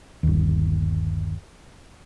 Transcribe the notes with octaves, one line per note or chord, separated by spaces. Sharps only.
G1 D#2